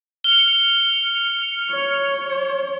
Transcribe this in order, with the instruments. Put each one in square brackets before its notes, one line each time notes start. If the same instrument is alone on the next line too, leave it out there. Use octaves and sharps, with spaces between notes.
[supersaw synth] F6 C#7 [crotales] G7
[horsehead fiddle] C#5